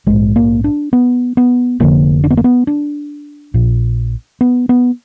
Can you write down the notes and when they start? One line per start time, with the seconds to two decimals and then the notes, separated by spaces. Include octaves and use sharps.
0.06 A#1 G#2 G#3
0.36 A#3
0.64 D4
0.93 B3
1.37 B3
1.80 F1 F2 D3 A#3
2.24 D4
2.30 B3
2.37 A#3
2.44 B3
2.67 D4
3.54 A#1 A#2
4.41 B3
4.69 B3